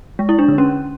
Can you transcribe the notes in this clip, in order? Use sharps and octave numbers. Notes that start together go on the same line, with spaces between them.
G#3
E4
D4
D3
C#4